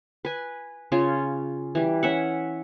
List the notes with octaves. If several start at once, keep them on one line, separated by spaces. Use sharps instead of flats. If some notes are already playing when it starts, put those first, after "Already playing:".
B4 G#5
C#3 C#4 F4
E3 G3
C#4 E5 F#5